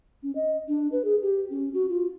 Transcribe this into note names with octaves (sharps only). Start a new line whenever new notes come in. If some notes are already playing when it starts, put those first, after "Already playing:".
C#4
D#5
D4
B4
G#4
G4
C#4
F#4
F4